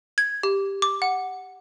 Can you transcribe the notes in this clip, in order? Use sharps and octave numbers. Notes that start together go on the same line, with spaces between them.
G#6
G4
D6
F#5